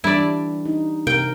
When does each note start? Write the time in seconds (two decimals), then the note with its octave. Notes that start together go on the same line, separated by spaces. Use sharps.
0.04 E3 G3 D4 E4 D5
0.65 D#4
1.07 C3 C4 A#4 G5